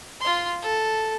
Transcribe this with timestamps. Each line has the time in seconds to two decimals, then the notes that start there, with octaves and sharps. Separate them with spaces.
0.21 F4 C6
0.62 A4